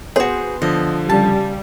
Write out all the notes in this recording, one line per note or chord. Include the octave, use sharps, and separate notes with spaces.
B3 F#4 G#4 C5
D3 F3 D#5
C#3 G3 A5